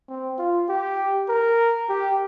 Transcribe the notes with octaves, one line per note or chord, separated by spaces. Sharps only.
C4
F4
G4
A#4
G4